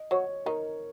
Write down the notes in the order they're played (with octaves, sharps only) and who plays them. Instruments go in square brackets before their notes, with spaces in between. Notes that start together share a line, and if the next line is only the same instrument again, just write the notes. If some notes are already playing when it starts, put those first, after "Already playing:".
Already playing: [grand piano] D#5
[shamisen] F#3 F#4 [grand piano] C#5
[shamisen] D#3 D#4 [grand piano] A#4